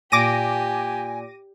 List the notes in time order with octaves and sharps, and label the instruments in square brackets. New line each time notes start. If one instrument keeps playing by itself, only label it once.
[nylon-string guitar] A#2 [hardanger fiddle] G4 [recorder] G#5 [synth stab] D6 A#6 D#7